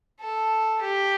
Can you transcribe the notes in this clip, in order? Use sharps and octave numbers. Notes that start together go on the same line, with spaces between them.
A4
G4